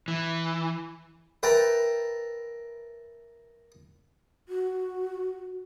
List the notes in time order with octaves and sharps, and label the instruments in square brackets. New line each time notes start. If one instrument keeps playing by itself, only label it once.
[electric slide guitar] E3
[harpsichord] A#4 B4 E5 G5 A5 A#5
[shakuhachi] F#4